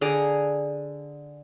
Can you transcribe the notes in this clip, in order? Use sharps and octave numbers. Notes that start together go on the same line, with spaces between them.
D3 G#4 A#5 D6